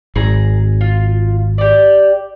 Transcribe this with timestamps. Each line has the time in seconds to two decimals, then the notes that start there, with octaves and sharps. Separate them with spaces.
0.16 G#1 G#4 A#5
0.81 F4
1.58 G4 D5